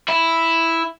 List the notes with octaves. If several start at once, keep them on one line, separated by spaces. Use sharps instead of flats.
E4